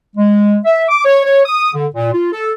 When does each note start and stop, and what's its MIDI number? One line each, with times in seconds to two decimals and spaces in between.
0.16 0.57 56
0.65 0.84 76
0.89 1.02 86
1.05 1.23 73
1.25 1.41 73
1.46 1.70 87
1.73 1.86 50
1.94 2.11 46
2.12 2.29 65
2.32 2.52 69